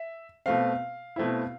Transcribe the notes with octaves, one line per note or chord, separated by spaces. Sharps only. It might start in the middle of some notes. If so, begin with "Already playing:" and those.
Already playing: E5
B2 A3 C4 F5
B2 A3 C4 E4